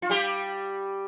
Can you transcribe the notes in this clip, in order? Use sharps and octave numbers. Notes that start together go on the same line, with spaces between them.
F4
G3 G4